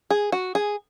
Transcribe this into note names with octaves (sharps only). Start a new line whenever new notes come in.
G#4
F#4
G#4